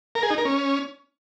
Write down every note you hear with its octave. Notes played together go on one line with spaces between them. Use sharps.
A#4
G#4
D#4
A#4
C#4